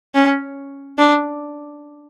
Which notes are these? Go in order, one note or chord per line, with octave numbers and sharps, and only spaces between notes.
C#4
D4